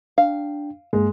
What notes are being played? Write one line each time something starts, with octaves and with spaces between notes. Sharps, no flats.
D4 F5 G5
G2 G#3 A#3